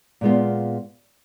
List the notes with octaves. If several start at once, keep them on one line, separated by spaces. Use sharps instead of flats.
A#2 G#3 B3 F4